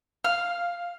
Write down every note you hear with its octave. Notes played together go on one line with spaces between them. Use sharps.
F5 F6